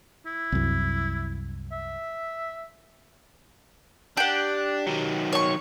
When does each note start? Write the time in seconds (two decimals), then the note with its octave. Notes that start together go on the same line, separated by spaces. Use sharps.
0.26 E4
0.52 C2 F#2
1.72 E5
4.17 D4 G4 F#5
4.87 D#3 F#3
5.33 C#5 C#6